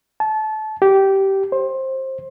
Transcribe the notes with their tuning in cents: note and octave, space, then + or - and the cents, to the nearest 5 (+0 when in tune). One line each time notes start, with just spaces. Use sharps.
A5 -25
G4 -15
C5 +20